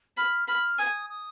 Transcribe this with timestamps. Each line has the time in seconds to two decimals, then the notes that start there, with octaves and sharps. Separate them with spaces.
0.17 B5 F6
0.48 B5 F6
0.79 G#5 D#6
1.10 D#6